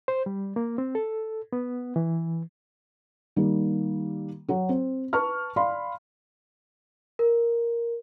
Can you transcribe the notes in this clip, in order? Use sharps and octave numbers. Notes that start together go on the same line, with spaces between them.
C5
G3
A#3
C4
A4
B3
E3
D#3 G3 A#3
F#3 F#4
C4
B4 A5 C#6 F6
D5 F5 B5 C6
A#4